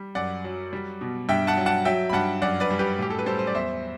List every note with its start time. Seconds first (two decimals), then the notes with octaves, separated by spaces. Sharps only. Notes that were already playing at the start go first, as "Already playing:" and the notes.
Already playing: G3
0.15 F#2 D5 F#5
0.44 F#3
0.73 G3
1.01 B2
1.29 G2 E5 G5
1.47 F#5 A5
1.57 F#3
1.66 F#5 A5
1.85 F#3 E5 G5
2.10 B5
2.13 G2 F#5 A5
2.42 F#2 D5 F#5
2.60 B4 D5
2.71 G3
2.79 G4 B4
2.98 A2 G4
3.10 A4
3.19 B4
3.26 G3 A4 C5
3.39 C5
3.47 D5
3.54 E2 C5 E5